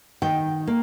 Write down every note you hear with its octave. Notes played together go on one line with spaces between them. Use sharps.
D#3 G5
A#3